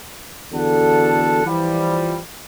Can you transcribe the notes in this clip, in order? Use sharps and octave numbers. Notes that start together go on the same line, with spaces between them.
E2 D3 F#4 A4 F#5 A5
E3 F3 G3